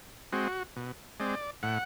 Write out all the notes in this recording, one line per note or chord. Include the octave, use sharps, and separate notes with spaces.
G#3 C4 F#4
B2
G#3 C4 D5
A2 F#5